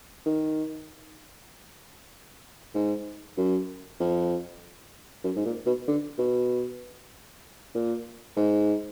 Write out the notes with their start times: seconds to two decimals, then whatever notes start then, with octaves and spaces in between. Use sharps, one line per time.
0.26 D#3
2.74 G#2
3.37 F#2
4.00 F2
5.24 F#2
5.36 G#2
5.45 A#2
5.66 B2
5.88 D3
6.18 B2
7.75 A#2
8.36 G#2